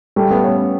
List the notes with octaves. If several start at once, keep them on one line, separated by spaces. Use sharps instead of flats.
G3 A3
A3 B3
B3 C#4